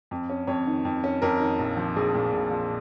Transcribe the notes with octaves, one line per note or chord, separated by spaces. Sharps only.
F2
C#4
F2 C#5
D#3
F2
C#4
F2 A#4
D#3
A#1
F3
A#1 G#4
A#2
A#1
F3